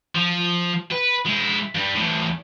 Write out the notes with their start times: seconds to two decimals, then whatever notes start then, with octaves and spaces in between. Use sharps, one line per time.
0.15 F3
0.92 B4
1.26 G#3 E4
1.75 G2 G3
1.96 E2 A2